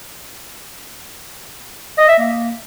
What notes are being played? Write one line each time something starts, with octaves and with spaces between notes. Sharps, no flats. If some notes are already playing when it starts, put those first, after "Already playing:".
D#5
E5
A#3